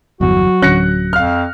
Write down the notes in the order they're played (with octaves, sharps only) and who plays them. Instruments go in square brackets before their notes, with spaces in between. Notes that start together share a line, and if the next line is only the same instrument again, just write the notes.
[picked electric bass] G1 E2 [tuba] F#3 [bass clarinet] F#4
[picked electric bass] D1 D3 C#4 [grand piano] F#6 A#6 C#7
[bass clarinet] F2 [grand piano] F5 F6